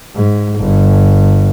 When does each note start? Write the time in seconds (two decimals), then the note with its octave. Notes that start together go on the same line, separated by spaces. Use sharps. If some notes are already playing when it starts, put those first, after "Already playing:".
0.15 G#2
0.59 G1